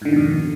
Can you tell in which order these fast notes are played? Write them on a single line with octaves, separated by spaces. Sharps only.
G#2 D3 D#3 B2 F2